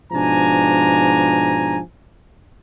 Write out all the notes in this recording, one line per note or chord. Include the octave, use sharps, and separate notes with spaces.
G#2 B2 F3 D4 G#5 A#5